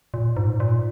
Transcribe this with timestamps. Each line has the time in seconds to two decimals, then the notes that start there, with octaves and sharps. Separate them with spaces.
0.14 A#2
0.37 G#2
0.60 A#2